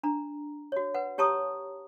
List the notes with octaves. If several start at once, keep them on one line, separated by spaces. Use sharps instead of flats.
D4 A#5
F#4 C#5
B4 F#5
G4 C#5 A5 A#5 C#6 D#6